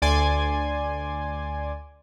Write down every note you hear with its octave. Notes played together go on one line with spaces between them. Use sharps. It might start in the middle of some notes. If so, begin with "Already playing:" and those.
D2 D5 G#5 C6